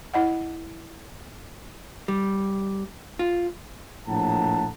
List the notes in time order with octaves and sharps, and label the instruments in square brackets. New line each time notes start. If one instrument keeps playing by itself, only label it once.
[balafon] E4 D#5 F#5
[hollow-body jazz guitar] G3
F4
[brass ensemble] A#1 A2 F#5 A5 A#5